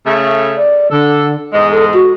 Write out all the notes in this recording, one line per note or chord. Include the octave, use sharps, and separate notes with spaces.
C#3 A3
D5
D3 D4 A4
E2 G#2 G#3 D#5
A4
F#4